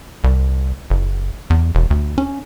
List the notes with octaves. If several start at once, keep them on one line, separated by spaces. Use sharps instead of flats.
C2
F#1
E2
E1
D2
C#4